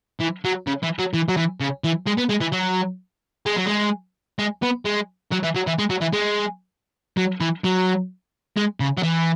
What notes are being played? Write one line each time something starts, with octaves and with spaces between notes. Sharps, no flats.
E3
F#3
C#3
E3
F#3
E3
F#3
E3
C#3
E3
G#3
B3
G#3
E3
F#3
G#3
F#3
G#3
G#3
B3
G#3
F#3
E3
F#3
E3
G#3
F#3
E3
G#3
F#3
E3
F#3
G#3
C#3
F#3
E3